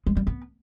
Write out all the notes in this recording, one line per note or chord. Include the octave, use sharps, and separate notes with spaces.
G#3
G3
B3